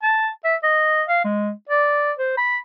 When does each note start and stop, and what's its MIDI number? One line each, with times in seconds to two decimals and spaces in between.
0.03 0.29 81
0.44 0.56 76
0.63 1.03 75
1.09 1.22 77
1.24 1.51 56
1.69 2.12 74
2.19 2.33 72
2.37 2.56 83